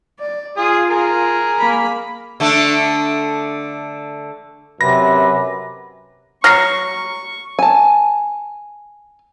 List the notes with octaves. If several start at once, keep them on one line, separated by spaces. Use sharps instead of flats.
D5
F4 G#4 G#5 D#6
G#4 A#4
A#3 B5
D3 A3 D4
F#2 C3 B4 A#6
F#3 C#6 F6 A#6 C7
G#5 A5